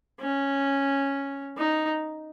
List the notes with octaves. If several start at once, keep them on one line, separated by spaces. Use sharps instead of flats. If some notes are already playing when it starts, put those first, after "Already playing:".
C#4
D#4